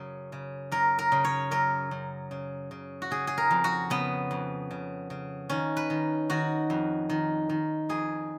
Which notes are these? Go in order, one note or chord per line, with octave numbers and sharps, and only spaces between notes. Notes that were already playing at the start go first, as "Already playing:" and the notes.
Already playing: F#2 C#3
C#3
F#2 A#4
A#4
C#3
C#5
F#2 A#4
F#2
C#3
C#3
F#4
C#3 G#4
G#4
A#4
F2
F#4
C#3 B3
F2
C#3
C#3
D#3 C#4
B4
D#3
D#3 F#4
F2
D#3
D#3
F2 G#4